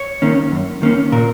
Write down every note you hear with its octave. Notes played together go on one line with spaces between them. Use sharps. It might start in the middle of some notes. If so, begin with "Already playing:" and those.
Already playing: C#5
D#3 A#3 C#4
F#2
D#3 A#3 C#4
A#2 A#4